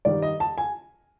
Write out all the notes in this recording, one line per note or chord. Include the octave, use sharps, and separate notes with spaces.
G2 D#3 G3 D5
D#5
A5
G#5